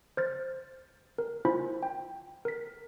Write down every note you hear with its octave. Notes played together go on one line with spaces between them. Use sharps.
C5 F6 A6
A#4
E4 F4 C5 G#5 B5
G5
A#4 B6